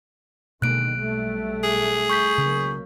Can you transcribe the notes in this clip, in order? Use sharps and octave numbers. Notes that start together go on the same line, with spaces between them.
B2 D3 D#3 G#3 A#3 F#6 D7
B1 G3 A3
G#4
C#6 G6 B6
C#2 C#3 F#3 A#3